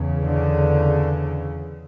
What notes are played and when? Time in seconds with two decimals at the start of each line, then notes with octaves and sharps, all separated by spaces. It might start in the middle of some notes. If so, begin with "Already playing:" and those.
Already playing: E2 C#3
0.22 D3